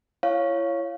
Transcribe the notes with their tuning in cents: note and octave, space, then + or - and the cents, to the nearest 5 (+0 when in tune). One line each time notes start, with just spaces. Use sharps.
E4 +40 C#5 +0 F5 +0